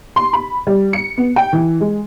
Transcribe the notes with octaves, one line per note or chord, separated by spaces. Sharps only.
C6
B5
G3
C#7
B3
G5
E3
G#3